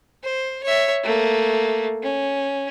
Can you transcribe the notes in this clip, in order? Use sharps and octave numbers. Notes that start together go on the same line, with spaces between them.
C5
C#5 E5
A3 A#3
C#4